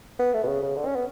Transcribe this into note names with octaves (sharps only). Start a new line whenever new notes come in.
B3
A3
B2
C#3
C#3
D3
C#4
B3